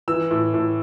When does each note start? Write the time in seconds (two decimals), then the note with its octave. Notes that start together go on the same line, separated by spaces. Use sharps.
0.08 E3 E6
0.31 A2
0.54 A2